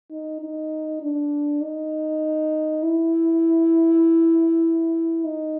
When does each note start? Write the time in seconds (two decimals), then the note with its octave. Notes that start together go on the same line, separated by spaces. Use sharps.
0.11 D#4
0.41 D#4
1.02 D4
1.62 D#4
2.83 E4
5.25 D#4